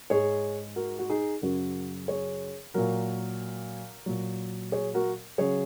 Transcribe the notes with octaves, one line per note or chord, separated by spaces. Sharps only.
G#2 G#3 G#4 C#5
F#4 A#4
F#4
D#4 G#4
F#2 C#3 F#3 F#4 A#4
G#4 C#5
A#2 F#3 F#4 A#4
A#2 F#3
G#4 C#5
F#4 A#4
C#3 F#3 G#4 C#5